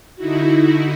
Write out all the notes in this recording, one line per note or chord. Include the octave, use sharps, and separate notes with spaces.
D3 D#4 E4 F#4